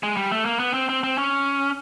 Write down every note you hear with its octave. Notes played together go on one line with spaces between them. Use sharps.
G#3
G3
A3
A#3
B3
C4
C4
C4
C#4